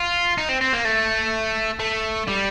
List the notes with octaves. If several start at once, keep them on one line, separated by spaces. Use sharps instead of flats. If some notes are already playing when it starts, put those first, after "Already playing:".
Already playing: F4
D#4
C4
C4
A#3
A3
A3
G3